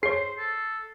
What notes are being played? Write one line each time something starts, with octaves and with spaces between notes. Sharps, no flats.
G#4 C5 C#5 C7
A4